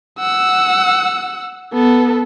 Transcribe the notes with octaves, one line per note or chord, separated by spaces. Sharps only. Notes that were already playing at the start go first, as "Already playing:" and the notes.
F#5 E6
B3 A4